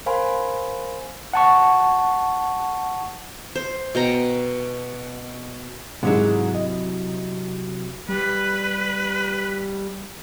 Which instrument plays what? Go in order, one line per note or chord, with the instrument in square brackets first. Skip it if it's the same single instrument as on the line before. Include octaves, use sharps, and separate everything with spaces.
[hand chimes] A#4 C5 F5 G#5 B5 C6
[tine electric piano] F#5 A5 C#6
[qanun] C5
B2 G5 A#5
[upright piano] G#2 D#3 G#3 [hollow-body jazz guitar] C3 F#3 E4
[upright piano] D#5
[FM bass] G3 [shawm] B4